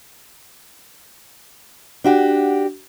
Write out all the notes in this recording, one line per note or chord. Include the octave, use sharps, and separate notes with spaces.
D4 F#4 G4